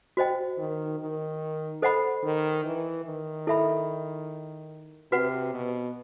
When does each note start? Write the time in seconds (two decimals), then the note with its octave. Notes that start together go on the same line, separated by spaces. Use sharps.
0.17 F#4 C5 D#5 G5
0.58 D#3
0.99 D#3
1.82 A4 C5 D#5 F#5 B5
2.24 D#3
2.64 E3
3.05 D#3
3.47 E4 A4 E5 B5
5.12 C3 F#4 B4 F#5
5.54 B2